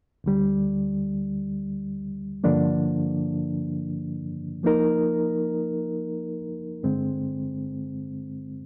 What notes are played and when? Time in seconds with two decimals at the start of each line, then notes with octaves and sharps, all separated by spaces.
0.24 D2 D3 G3
2.44 G2 D3 F3 A#3 D4
4.64 F3 A#3 D#4 A#4
6.83 G2 D3 G#3 C4